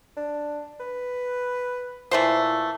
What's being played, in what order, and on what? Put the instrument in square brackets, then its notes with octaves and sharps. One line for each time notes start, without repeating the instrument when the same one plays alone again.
[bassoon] D4
B4
[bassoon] A#2 [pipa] E3 A3 C5